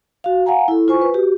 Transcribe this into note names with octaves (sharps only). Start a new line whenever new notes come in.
F#4 F5
F5 F#5 G#5 A#5
E4 A4
F4 C5 G#5 C#6
B4
F#4 G4